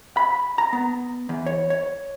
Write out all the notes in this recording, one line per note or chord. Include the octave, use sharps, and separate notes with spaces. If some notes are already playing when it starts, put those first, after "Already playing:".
B5
A#5
B3
E2
C#5
C#5